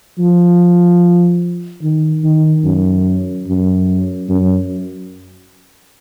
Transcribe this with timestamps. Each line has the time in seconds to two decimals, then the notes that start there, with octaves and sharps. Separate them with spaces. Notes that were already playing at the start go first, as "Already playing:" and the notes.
0.19 F3
1.82 D#3
2.24 D#3
2.64 F#2
3.47 F#2
4.29 F#2